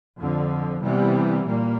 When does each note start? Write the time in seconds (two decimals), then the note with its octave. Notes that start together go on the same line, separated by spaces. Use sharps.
0.18 F2 D3 F3
0.82 C3 E3 G3 B3
1.47 A#2 G3 A#3